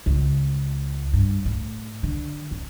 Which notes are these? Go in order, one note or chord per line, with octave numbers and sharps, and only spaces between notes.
C#2
G2
A2
D3
C4